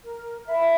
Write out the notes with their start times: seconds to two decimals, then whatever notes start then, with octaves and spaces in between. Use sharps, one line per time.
0.04 A#4
0.46 E5 B5